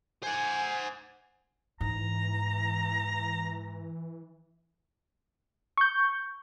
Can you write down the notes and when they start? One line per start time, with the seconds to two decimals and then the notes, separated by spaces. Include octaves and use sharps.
0.23 C5 F#5 G#5
1.81 G#2 E3 A#5
5.78 C#6 G6